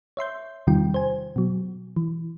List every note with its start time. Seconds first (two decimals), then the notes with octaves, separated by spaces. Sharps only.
0.17 C#5 E5 C6 G6
0.67 E2 C3 D#3 G3 F4 G5
0.94 C5 G#5
1.36 B2 F#3
1.96 E3